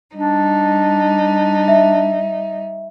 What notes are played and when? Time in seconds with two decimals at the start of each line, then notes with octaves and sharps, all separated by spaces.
0.15 G3 D4 D#4
1.68 E5